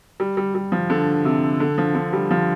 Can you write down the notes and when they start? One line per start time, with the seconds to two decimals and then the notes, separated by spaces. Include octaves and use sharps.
0.20 G3
0.37 G3
0.55 G3
0.72 F3
0.90 D3
1.25 C3
1.60 D3
1.78 F3
1.95 D3
2.13 G3
2.31 F3